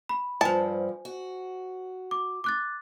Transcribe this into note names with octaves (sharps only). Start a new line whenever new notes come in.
B5
G2 F3 C5 G#5 A5
F#4
D6
D6 F#6 A6